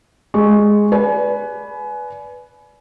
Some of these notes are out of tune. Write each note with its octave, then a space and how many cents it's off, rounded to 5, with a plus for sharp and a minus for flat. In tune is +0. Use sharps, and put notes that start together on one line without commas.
G#3 +0 G#4 +0 C#6 +0
B4 +0 D5 -15 G#5 +30